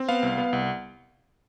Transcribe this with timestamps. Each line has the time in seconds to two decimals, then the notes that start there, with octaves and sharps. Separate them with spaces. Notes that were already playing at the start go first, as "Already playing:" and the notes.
Already playing: C4
0.09 B3 F5
0.23 C2
0.38 B3
0.53 C2